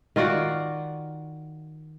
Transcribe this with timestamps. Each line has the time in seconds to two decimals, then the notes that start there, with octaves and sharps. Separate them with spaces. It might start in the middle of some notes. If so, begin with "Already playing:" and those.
0.16 D#3 F4 F#4 D5